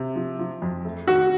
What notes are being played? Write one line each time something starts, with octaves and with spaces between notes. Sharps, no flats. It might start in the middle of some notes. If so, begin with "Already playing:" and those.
Already playing: C3
F3
F3
F2
A3
D#3 F#4